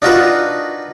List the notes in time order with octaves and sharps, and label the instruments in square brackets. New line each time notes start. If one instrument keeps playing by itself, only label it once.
[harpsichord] D4 D#4 F4 F#4 A#4 B4